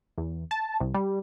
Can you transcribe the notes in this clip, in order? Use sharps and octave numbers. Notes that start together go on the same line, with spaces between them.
E2
A5
C2
G3